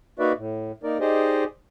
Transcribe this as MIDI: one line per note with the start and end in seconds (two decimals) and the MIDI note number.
0.19 0.33 58
0.19 0.33 63
0.19 0.33 66
0.19 0.33 71
0.19 0.33 74
0.19 0.33 76
0.37 0.72 45
0.83 0.98 58
0.83 0.98 63
0.83 0.98 70
0.83 0.98 74
1.00 1.44 63
1.00 1.44 67
1.00 1.44 68
1.00 1.44 72
1.00 1.44 74
1.00 1.44 75